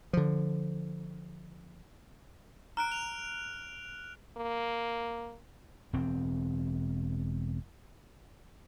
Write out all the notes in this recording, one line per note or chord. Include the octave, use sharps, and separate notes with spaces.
D3 F3
A#5 F6 F#6 D7
F7
A#3
E1 C4